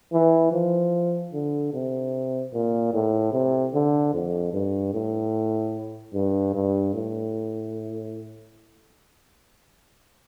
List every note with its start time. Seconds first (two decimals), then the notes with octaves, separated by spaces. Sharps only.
0.13 E3
0.52 F3
1.33 D3
1.74 C3
2.53 A#2
2.93 A2
3.33 C3
3.74 D3
4.14 F2
4.53 G2
4.94 A2
6.14 G2
6.54 G2
6.94 A2